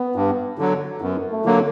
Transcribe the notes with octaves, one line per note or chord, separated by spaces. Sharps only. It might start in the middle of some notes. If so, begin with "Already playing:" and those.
Already playing: B3
G2
D3 F#3
F#2 B3
A3
D3 F#3 A#3